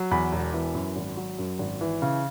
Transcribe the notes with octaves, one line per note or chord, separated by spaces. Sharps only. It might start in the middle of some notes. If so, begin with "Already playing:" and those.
Already playing: F#3
E2 B5
E1
E3
F#2
G#1
F#3
F#2
G#1
E3
C#3